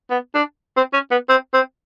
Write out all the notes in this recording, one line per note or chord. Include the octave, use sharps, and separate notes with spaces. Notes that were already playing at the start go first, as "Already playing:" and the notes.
B3
D4
C4
C#4
B3
C4
C4